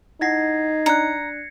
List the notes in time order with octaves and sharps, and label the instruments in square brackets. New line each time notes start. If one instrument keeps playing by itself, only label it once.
[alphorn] D#4 [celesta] E4 D#5 F#5 [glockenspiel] G#6 A#6 C7
[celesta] D4 D5 F#6 [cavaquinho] A#5 [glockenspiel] C#7